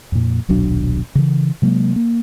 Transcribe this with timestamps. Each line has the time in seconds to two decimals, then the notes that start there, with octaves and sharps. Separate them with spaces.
0.12 F2 A#2
0.49 D#1 B1 F#3 D4
1.15 C#3 E3
1.62 C3 F#3 G#3 A#3
1.96 A#3